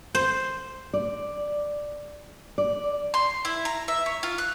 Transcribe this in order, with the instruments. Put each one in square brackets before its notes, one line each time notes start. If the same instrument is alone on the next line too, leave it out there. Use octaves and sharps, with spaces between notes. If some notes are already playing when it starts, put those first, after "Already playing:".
[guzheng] C5
[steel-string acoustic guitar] D5
D5
[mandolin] C6
E4
A#5
E5
C#5
F4
F#6